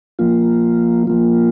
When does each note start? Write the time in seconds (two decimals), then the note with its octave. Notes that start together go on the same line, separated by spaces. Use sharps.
0.19 F3 A#3 F4
1.07 F3 A#3 F4